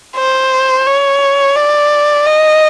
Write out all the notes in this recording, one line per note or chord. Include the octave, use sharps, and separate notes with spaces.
C5
C#5
D5
D#5